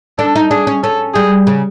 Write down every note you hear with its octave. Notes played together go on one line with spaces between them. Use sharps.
D4 A4
D#4
D4 G#4
C#4
C#4 A4
G3 G#4
C#3